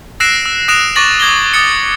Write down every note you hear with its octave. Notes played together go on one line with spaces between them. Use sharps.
E6 F#6 A#6 C7 D7 E7
E6
D#6 F#6 A#6 D7 E7 F7
C#6 D6 A6 A#6 F#7
D#6 G#6 A#6 G7
D#6 A6 C#7